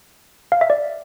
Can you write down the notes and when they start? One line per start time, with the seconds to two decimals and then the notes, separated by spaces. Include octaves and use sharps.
0.52 F5
0.61 E5
0.70 D5